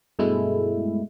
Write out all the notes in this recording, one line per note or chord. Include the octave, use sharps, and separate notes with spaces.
G2 B2 G#3 A3 E4